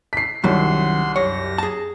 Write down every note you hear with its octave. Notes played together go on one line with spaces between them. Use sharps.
B6 C7
C2 F#2 D#3 F#3 F#5 C6
F#2 G4 C#5 A#6
G#4 A5